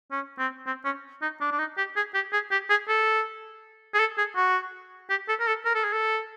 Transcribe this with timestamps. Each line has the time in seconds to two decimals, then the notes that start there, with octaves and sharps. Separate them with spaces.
0.12 C#4
0.39 C4
0.67 C4
0.85 C#4
1.22 D#4
1.41 D4
1.52 D4
1.59 D#4
1.78 G4
1.96 G#4
2.14 G4
2.33 G#4
2.51 G4
2.70 G#4
2.89 A4
3.94 G#4
4.00 A4
4.18 G#4
4.36 F#4
5.10 G4
5.29 A4
5.40 A#4
5.47 A4
5.65 A#4
5.75 A4
5.84 G#4
5.93 A4